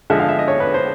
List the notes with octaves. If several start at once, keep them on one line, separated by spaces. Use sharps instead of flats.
D3 F3 G#3 E5
F5
E5
D#5
C#5
B4
C5